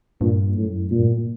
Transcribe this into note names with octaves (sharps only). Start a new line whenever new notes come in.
G2 A#2
F#2 A2
G2 A#2
A2
A#2